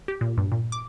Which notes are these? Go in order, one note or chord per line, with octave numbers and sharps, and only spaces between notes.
G4
A#2
G2
A#2
D6